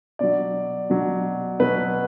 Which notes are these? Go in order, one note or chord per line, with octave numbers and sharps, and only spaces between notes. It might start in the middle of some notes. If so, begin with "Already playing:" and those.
B2 F#3 D5
B2 F#3
B2 F#3 B4